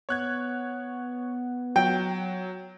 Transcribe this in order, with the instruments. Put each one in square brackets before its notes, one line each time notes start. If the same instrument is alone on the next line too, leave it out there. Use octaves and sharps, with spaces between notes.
[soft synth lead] B3 [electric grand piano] C#5 F#6 G#6
[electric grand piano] F#3 [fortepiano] G5